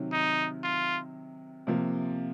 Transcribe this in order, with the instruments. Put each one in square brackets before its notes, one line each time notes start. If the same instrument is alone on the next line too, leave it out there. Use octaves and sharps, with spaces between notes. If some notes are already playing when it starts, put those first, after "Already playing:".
Already playing: [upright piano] C3 D#3 F#3
[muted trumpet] D#4
F4
[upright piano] C3 F3 A#3